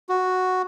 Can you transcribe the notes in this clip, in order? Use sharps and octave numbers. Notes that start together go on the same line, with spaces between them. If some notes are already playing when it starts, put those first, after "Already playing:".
F#4